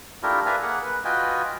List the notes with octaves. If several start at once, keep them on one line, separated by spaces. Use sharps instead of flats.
A3 D4 E4 F4 G4 A#4
B4 D5 E5 F5 G#5 A#5
A#3 G#4 F#5
B4
F4 F#4 B4 D#5 G5 G#5